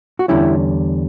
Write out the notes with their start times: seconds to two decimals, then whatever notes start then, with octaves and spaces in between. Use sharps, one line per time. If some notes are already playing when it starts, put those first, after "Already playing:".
0.19 F#4
0.28 E2 D3 G3 C#4 E4 G4